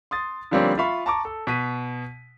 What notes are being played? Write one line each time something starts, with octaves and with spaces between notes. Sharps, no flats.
C6 D#6 A6
D3 F3 G3 A#3 C4 C#4
F4 E5 F5 B5 C#6
A5 A#5 C#6 D6
A4
B2 B6 D#7